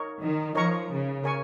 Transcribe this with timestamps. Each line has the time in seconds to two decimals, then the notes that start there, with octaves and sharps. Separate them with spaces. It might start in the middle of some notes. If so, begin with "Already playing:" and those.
Already playing: D#4 A#4 C#5 C#6
0.20 D#3
0.55 F3 D#4 A#4 C#5 A#5 C#6
0.90 C#3
1.24 A#4 C#5 G#5 C#6